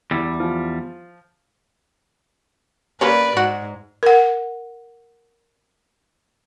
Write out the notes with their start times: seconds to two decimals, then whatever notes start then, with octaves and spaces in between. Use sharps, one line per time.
0.11 E2 G3 E4 E6
0.40 F3 F4
3.01 G3 A#3 C#4 B4 D5
3.37 G#2 F#4
4.03 A#4 F#5